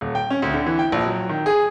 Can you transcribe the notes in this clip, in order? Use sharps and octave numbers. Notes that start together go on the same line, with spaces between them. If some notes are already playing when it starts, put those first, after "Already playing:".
D#1
G5
C#4
D2
D3
E3
G5
A#1
F#3
D#3
G#4